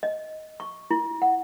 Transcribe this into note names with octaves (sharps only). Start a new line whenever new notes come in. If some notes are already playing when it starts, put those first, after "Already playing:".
D#5
C#6
E4
F#5